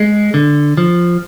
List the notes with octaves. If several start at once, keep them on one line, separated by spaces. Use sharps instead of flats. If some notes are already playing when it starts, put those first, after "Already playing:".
Already playing: G#3
D3
F3